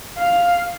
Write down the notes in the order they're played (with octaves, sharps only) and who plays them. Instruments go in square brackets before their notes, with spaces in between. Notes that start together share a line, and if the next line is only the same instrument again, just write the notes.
[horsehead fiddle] F5